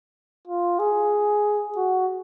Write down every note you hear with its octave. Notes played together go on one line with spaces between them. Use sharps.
F4
G#4
F#4